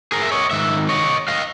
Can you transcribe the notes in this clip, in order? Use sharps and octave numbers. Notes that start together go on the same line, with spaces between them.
G#4 A#4
E5
C#5 D#5
G#2 D#3 E5
C#5 D#5
D#5 F5